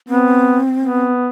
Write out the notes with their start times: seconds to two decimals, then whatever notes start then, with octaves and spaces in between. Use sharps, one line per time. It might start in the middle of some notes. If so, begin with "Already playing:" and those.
0.08 B3 C4
0.80 B3